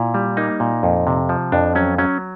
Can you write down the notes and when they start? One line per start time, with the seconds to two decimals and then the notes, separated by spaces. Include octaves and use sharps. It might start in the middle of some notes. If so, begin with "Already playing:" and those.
Already playing: A#2 E4
0.14 G3
0.37 A#3 D#4
0.60 A#2
0.83 F2
1.07 C3
1.29 F3
1.52 F2 D4
1.75 F#3 C#4
1.98 F#3 C#4